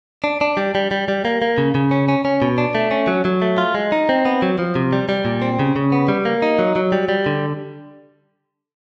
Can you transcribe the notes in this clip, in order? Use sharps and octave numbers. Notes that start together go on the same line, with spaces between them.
D4
D4
G3
G3
G3
G3
A#3
A#3
C#3
C#3
C#4
C#4
C#4
B2
D4
A3
C#4
F#3
F#3
A3
F4
G#3
D#4
C4
B3
F#3
F3
C3
G3
G3
A#2
C4
C#3
C#3
B3
G3
A#3
D#4
F#3
F#3
G3
G3
D3